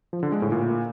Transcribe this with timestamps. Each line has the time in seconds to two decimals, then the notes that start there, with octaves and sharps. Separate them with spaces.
0.13 F3
0.23 D3
0.32 G#3
0.42 A2
0.52 A#2